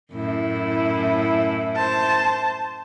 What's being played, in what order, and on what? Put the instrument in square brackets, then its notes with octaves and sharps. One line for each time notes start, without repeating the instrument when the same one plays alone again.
[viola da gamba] F#2 A2 E4
[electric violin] C5 A5